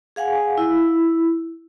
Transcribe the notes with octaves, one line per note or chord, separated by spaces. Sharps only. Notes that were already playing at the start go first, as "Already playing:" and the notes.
G#4 F5 F#5 G#5
E4